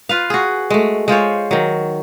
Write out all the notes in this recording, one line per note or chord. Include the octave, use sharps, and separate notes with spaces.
F4 B4 F5
F#4 G#4
G#3 A3
G#3 F4 C5 C#5
D#3 F#3